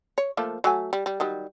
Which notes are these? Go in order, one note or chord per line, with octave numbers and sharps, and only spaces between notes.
C#5
F3 A3 A#3
F#3 A3 G#5
G3
G3
D#3 F#3 G3